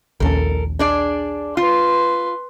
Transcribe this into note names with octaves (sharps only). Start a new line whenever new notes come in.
A#1 D#2 C#4 A4 A#4
D4 G#4 D5
F4 B4 C6